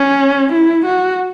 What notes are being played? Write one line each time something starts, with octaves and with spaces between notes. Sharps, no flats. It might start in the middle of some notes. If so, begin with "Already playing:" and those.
Already playing: C#4
E4
F#4